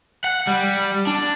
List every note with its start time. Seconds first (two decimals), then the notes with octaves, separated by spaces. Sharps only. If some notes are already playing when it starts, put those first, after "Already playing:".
0.24 F#5
0.47 G3
1.07 D4